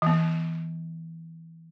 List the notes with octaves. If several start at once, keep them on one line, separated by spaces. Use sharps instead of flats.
E3 B3